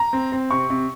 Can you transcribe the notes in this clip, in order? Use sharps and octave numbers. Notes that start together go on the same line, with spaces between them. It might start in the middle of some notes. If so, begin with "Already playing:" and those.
Already playing: A#5
C4
C4
C3 C#6
C3